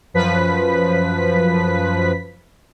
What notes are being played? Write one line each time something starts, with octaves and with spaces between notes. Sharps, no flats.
F#2 F3 B4 B6